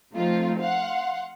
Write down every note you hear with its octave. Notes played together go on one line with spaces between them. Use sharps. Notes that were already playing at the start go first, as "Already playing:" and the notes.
F3 A3 C4 D#4 F4
F5 F#5 C6